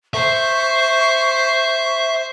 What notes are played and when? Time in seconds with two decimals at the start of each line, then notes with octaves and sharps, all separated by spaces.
0.14 C5 E5 C#6